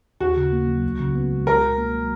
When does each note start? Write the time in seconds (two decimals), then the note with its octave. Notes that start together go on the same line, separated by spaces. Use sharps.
0.20 D#2 F#4
0.37 C#3
0.52 A#3
0.67 F#3
0.83 C#2
0.99 C#3
1.16 B3
1.30 G#3
1.47 C#2 A#4
1.62 B2
1.78 A#3
1.93 F#3